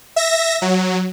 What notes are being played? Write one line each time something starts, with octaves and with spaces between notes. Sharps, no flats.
E5 A#6
F#3